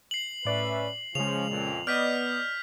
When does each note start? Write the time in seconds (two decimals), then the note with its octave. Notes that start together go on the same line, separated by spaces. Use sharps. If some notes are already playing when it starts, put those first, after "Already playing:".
0.11 C7 F#7
0.45 A2 C#4 B4 D5 E5
1.15 C#3 F3 G#3 C#4 F7
1.49 F2 A#2
1.87 B3 D5 D#5 F6 G6 B6